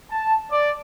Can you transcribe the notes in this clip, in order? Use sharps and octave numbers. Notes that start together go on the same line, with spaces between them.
A5
D5